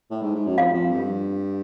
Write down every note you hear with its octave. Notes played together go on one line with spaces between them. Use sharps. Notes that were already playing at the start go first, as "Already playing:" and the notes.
A2
G#2
G#2
F#2
F2 F5
F2
G2